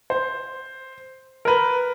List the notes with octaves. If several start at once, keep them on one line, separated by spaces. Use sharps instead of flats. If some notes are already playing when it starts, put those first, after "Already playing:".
C5
A#4 B4